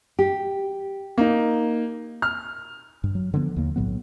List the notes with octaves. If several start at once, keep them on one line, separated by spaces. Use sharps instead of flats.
G4
A#3 D#4
F6
G2
F#3
D3 F3 A#3 B3
D#2 A#3
B1 A2 F#3 B3